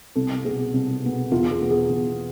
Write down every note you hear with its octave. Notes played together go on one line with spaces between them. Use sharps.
C2 A4
B2 B3 G#4
C2
B2 B3
E2 F4
G#4
B2 B3
G#4
E2